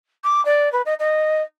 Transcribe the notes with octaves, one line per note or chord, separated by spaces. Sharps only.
D6
D5
B4
D#5
D#5